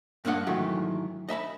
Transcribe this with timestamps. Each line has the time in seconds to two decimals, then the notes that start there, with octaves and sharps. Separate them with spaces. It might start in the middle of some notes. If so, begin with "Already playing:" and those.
0.25 G2 A#3 D4 D#5 F#5
0.46 G#2 D#3 E3 F#3 A3 G4
1.29 D#5 E5 A#5 B5